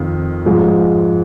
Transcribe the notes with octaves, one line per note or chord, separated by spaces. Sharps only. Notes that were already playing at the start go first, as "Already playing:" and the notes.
Already playing: F2 D#3
G#2 F3 G#3